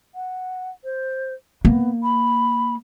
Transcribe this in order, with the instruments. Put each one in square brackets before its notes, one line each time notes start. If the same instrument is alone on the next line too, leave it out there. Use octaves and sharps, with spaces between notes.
[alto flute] F#5
C5
[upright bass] A#3 [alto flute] B3
[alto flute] B5